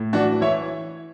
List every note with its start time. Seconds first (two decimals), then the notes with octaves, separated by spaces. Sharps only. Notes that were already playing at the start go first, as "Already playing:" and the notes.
Already playing: A2
0.13 E3 D4 F#4
0.41 E3 C#5 E5